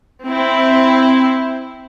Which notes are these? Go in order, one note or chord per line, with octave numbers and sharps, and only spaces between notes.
C4 E4